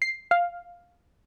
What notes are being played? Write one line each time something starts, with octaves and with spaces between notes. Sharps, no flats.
C7
F5